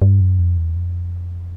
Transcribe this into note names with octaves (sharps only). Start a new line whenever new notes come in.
G2
F#2
F2
E2
F2